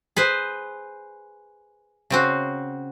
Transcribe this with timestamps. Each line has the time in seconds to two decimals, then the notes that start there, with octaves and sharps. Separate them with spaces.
0.16 G#4 B4 C5
2.10 C#3 C4 F#4